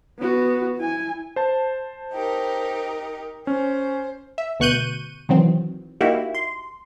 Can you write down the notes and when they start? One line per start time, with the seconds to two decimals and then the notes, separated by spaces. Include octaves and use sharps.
0.19 B3 F#4
0.77 E4 G#5
1.36 C5 A5
2.13 D#4 G4 A#4
3.47 C#4 C5
4.38 E5
4.60 D2 B2 C#6 F#6 G6 D#7
5.29 C3 D#3 E3 F#3 C4
6.01 A#3 D#4 E4 F#4 G4
6.35 C6